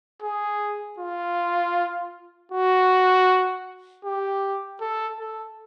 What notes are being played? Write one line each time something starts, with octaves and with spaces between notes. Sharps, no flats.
G#4
F4
F#4
G4
A4
A4